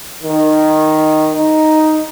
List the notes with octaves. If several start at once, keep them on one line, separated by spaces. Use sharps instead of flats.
D#3
D#4